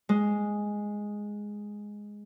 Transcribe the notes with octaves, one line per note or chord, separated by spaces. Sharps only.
G#3